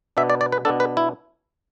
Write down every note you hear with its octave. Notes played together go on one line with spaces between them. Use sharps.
B2 B3 D4 E5
D5
D5
B4
B2 B3 D4 A4
B4
E4